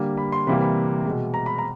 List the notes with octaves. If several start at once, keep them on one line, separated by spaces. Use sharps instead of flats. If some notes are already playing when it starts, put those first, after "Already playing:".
Already playing: D3 G3 A#3
B5
C6
C3 E3 G3 A#3 B5
B5
B2 G#3
A#5
B5
A#5